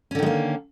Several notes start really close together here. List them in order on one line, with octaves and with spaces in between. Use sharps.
C#4 D3 D#3 G#3 A#3